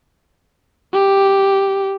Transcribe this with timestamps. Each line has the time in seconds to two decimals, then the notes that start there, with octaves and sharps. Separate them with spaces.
0.94 G4